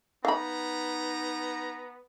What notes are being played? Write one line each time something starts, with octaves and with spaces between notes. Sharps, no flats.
B3 D#4 F5 A#5 B5